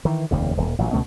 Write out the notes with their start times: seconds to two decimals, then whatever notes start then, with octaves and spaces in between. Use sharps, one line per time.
0.05 D#3 E3
0.31 F1 D#2 C#3
0.57 D#1
0.78 A1 A#2 F#3
0.93 C#2 B2 A3 C#4